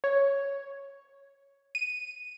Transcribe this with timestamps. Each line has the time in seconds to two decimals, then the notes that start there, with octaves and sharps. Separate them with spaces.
0.04 C#5
1.75 D#7